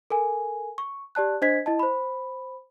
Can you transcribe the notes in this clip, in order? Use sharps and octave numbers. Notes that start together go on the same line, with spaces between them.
A4 A#4 G#5
C#6
G4 D5 A5 F#6
D4 C5 D#5 G#6 B6
E4 D#5 A5
C5 B5